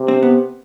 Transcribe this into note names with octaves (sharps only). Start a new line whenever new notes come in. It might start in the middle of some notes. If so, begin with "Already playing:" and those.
Already playing: C3
C4
B3